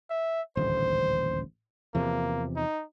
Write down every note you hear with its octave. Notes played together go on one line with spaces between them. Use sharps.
E5
D#1 A1 D2 C5
E2 C3 F3 A#3
D#4